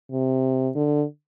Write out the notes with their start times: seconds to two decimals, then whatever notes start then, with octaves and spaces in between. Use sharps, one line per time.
0.12 C3
0.75 D3